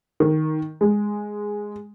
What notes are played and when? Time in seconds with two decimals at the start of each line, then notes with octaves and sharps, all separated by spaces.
0.20 D#3
0.81 G#3